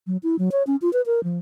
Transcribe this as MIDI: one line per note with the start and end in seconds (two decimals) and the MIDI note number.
0.07 0.17 54
0.23 0.36 64
0.39 0.49 54
0.52 0.63 73
0.67 0.76 61
0.82 0.92 65
0.93 1.02 71
1.06 1.23 70
1.24 1.39 53